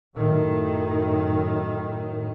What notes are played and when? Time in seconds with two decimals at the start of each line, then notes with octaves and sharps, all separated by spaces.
0.16 F#2 A2 D#3